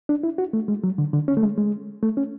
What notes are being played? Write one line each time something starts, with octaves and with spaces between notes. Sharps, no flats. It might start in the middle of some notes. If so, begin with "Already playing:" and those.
D4
E4
F#4
A3
G#3
F#3
D3
D3
C#4
A3
G#3
G#3
A3
C#4